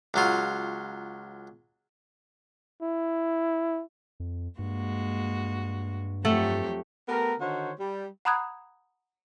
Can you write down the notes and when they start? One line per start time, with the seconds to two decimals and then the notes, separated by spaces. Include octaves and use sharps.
0.14 C#2 F#3 F4
2.82 E4
4.20 F2
4.59 G2 G#3 A#3 F#4
6.25 F2 F#3 A3 G4 A4 F#5
7.09 A3 B3 G4 A#4
7.40 D3 D#3 D#4 F#4 C5 C#5
7.79 G3
8.25 F#5 A#5 B5 D#6 F#6 G#6